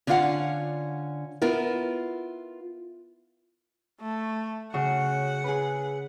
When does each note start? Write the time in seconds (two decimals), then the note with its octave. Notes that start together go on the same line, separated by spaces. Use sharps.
0.07 D3 C#4 D4 F4 F5 F#5
1.42 B3 E4 F4 A#4
4.01 A3
4.74 C#3 C#4 F#4 F#5
5.44 G#4 B4